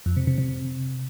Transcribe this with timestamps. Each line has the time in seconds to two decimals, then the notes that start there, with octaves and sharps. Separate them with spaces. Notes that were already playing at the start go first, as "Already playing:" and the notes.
0.06 F2
0.17 C3
0.27 C3
0.38 C3